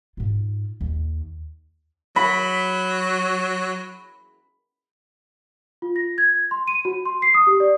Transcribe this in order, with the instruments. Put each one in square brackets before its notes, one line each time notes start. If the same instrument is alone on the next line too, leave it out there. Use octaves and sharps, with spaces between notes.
[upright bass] G#2 F4
D#2
[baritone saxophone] F#3 [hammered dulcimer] B5
[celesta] F4
A#6
G#6
C6
D#7
F#4
C6
C7
D#6
G4
D5